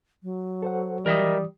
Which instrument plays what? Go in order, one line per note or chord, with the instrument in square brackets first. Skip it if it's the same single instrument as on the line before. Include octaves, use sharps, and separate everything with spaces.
[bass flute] F#3
[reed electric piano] A4 C5 F#5
[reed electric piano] E3 D#6 [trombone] G3 [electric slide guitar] A#4 D#5 E5